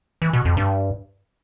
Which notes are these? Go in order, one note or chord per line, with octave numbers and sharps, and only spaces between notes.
E3
B2
F2
G2